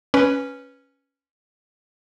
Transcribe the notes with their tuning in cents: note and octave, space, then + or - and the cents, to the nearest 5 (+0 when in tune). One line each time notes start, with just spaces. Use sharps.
C#4 +0 B4 +0